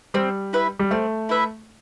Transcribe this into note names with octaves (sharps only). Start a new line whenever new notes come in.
G3 C4
E4 B4 E5
G3
A3 C4
E4 B4 E5